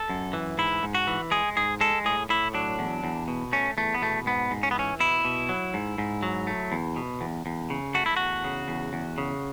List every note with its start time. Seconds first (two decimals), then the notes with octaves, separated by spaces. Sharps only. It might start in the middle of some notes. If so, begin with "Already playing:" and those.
Already playing: A4
0.09 F#2
0.33 E3
0.58 G#2 E4
0.83 G#2
0.95 F#4
1.07 E3
1.31 G#3 G#4
1.57 G#2 G#4
1.81 G#3 A4
2.05 A2 G#4
2.29 A2 E4
2.54 F#3 D4
2.79 E2
3.04 E2
3.28 B2
3.53 A3 C#4
3.77 E2 A3
3.94 B3
4.02 B2 A3
4.26 G#2 B3
4.51 G#2
4.63 C#4
4.71 B3
4.75 E3 C#4
5.00 B2 E4
5.25 B2
5.49 F#3
5.74 G#2
5.98 G#2
6.23 F#3
6.47 A3
6.72 E2
6.96 B2
7.21 E2
7.46 E2
7.70 C#3
7.94 A3 F#4
8.06 E4
8.17 E2 F#4
8.44 C#3
8.68 E2
8.93 E2
9.18 C#3